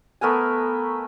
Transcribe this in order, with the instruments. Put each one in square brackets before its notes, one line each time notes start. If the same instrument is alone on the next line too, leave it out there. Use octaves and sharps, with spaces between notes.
[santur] A3 B3 A#4 G#5